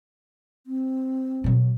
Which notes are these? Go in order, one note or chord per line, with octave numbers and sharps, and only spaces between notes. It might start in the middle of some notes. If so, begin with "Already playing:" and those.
C4
B2 F#3